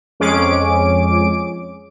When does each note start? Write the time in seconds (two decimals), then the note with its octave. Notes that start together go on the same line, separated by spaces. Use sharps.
0.20 F2 G#3 C#4 G#4 D6 D7